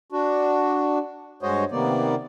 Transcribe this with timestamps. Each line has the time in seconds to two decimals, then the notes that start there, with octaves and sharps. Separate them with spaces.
0.12 D4 F#4
1.43 G2 G#3 F#4 C5 C#5 D#5
1.72 C3 D#3 A#3 B3 D5